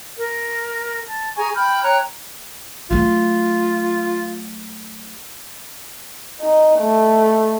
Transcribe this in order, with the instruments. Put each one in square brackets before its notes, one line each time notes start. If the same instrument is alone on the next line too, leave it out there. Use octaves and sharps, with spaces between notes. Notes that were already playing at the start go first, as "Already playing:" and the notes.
[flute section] A#4
A5
G#4 G#5 A#5 C#6
G5 B5 F6 G6
C#5 G5 A#5 F#6
[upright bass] F#3 A3 [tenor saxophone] F4
[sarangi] D#4
A3